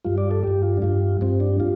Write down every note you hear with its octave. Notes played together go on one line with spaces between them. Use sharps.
G2 G3 F4
D5
A4
G2 G3 G4
F4
D4
G2 G3 F4
G2 G3 C4
D4
G3 F4